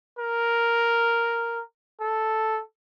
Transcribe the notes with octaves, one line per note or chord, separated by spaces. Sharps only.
A#4
A4